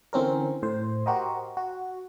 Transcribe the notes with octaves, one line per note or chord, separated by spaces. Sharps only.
D3 E3 C4 C#4 A#4
A2 C5
F#4 G4 A#4 C5 D#5
F#4